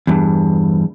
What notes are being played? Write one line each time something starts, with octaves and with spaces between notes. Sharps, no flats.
E2 G2